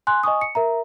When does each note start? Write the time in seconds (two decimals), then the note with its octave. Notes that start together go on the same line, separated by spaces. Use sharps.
0.07 G#5 C6 F#6
0.23 D#5 G#5 C#6 D#6
0.41 C#7
0.55 A#4 E5 A#5